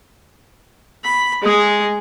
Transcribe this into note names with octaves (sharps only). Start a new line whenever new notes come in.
B5
G#3 G#4